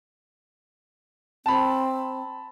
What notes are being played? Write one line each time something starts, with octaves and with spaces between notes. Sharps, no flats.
C4 A5 B5